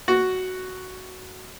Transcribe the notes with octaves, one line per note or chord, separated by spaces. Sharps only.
F#4